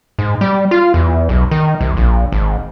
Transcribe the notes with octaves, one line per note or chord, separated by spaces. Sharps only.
G#2
G3
F4
E2
B1
D#3
C2
A#1
G#1